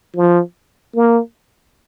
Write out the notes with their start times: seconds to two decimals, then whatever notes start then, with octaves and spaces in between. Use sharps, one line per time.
0.16 F3
0.96 A#3